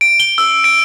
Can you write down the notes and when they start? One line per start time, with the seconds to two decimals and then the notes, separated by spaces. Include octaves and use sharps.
0.01 D7
0.20 G7
0.38 E6
0.64 D7